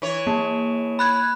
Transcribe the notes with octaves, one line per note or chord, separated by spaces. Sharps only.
E3 C#5
A#3
B5 F#6 G#6